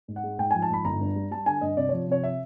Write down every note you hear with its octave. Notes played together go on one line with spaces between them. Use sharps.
G#2
F#5
G#3
G#2 G5
F3 G#5
A5
G#2 B5
G1 A#5
G2
G3
G3 A5
D3 G#5
G2 D#5
C3 D5
F3 C#5
C3 C#5
E5